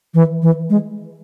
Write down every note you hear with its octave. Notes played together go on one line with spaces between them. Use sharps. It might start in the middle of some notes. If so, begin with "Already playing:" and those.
E3
E3
G#3